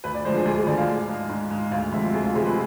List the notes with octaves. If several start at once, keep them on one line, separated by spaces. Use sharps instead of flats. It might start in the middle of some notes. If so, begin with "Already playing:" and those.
D2 B4
D5
D3 F3 G#3 C5
G#4
D2 G#4
G#4
D3 F3 G#3 D5
F5
G#2
G#3
G#2
G#3
D2 F5
C3 F3 G#3 E5
D2 G#4
F4
C3 F3 G#3 G#4
B4